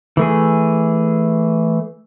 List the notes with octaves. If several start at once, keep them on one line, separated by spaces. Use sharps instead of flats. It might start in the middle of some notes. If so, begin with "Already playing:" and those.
E3 A3 G#4